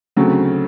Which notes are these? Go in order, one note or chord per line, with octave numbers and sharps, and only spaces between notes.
D2 C#3 F#3 A3 C4